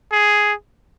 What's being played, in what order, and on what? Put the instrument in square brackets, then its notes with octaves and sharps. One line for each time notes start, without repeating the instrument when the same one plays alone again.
[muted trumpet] G#4